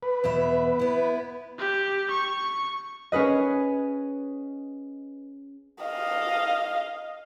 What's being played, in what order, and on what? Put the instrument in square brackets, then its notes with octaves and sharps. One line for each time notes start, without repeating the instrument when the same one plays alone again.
[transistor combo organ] B4
[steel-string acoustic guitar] E2 B2 E5
B3 E4
[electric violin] G4
C#6
[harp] C#4 G#4 B4 D#5
[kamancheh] D#5 F5